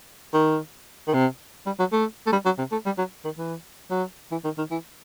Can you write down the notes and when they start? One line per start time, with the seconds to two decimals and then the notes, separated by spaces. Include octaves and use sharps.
0.34 D#3
1.08 D#3
1.14 C3
1.66 G3
1.79 F#3
1.92 A3
2.27 A3
2.32 G3
2.45 F#3
2.58 C3
2.72 A3
2.86 G3
2.98 F#3
3.25 D#3
3.38 E3
3.91 F#3
4.31 E3
4.44 D#3
4.58 D#3
4.71 E3